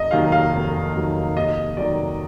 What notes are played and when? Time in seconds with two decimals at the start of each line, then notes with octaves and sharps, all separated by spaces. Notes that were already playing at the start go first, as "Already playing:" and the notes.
Already playing: F1 D#5
0.11 D#2 D#3 F#3 F5
0.32 F5
0.52 F1
0.95 D#2 D#3 F#3
1.36 D#2 D#5
1.77 D#3 F#3 D5